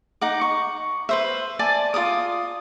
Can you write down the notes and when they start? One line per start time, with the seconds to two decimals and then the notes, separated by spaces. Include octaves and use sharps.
0.21 D#4 F#5 D6
0.41 C#6
1.09 B4 C5 E5
1.59 D5 G#5 A5 D6
1.94 F4 A4 D6 D#6